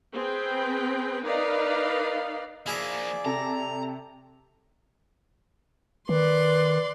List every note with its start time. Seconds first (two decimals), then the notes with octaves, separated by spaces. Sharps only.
0.13 C4 G#4 B4 G5
1.25 D#4 A#4 B4 D5 D#5 F5
2.66 F3 A#3 E4 G#4 D5 E5
3.25 C3 A4 A5 A#5
6.09 D#3 B4 D5 C6